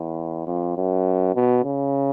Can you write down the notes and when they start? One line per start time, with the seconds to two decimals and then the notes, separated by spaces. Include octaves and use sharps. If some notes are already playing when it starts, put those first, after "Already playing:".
Already playing: E2
0.47 F2
0.77 F#2
1.35 B2
1.64 C#3